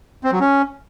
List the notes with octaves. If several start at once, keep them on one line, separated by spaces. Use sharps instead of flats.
C4
F#3
C#4